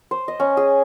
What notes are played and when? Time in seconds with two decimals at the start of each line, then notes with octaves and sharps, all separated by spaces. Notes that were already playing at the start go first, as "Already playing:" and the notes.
0.11 C5
0.28 D#5
0.40 C#4
0.57 G#4